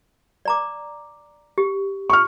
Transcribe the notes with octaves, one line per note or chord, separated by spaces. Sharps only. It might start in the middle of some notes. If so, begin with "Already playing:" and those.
D5 A#5 D6
G4
C#6 F6